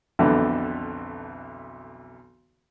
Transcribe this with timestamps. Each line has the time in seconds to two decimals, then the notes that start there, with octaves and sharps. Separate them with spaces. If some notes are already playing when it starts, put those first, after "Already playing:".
0.19 B1 F2 B2 D3 E3 A4